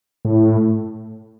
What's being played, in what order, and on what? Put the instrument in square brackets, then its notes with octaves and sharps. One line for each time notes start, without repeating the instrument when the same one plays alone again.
[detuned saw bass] A2